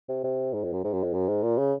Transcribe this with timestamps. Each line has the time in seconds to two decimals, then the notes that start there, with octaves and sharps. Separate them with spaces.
0.09 C3
0.24 C3
0.54 G#2
0.64 F2
0.73 F#2
0.84 G#2
0.93 F#2
1.03 F2
1.14 F#2
1.29 G#2
1.43 A#2
1.58 C#3